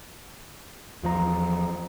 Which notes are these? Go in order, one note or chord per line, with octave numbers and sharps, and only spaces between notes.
E2 F3 F4 C5 A#5